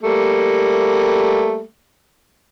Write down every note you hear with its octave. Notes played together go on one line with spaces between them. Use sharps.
G3 A3 A#3